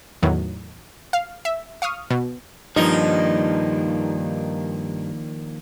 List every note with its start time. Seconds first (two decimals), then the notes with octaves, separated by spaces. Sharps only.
0.23 E2 A2 D#3 F#3
1.13 F5
1.45 E5
1.82 F5 C#6 D#6 F6
2.10 B2
2.76 G2 D#3 F3 A#3 D4 D#4